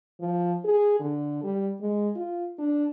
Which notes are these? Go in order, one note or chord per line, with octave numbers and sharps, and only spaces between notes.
F3
G#4
D3
G3
G#3
F4
D4